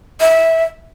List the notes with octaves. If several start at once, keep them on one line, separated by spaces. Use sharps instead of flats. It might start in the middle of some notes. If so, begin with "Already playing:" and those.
E5